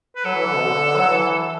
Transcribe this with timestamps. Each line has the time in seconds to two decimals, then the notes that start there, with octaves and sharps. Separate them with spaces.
0.16 B4
0.24 F#3 A4
0.35 E3
0.45 D3
0.55 B2
0.66 D3
0.96 F#3
1.07 E3